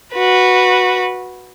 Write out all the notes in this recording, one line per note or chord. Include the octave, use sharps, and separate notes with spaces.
F#4 B4